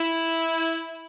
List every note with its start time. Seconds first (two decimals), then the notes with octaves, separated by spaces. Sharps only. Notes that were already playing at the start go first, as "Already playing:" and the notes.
Already playing: E4